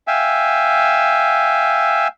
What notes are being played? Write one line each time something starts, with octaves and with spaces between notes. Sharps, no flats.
E5 F5 G5 G#5 E6